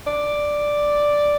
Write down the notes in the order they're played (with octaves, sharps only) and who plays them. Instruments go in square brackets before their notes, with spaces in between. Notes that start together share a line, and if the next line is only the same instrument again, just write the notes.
[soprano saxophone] D5